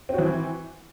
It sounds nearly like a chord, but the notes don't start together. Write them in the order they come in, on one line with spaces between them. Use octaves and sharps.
C4 F#4 E3